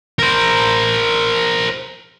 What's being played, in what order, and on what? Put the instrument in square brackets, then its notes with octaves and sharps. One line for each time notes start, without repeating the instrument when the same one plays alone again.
[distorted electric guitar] A#4 C5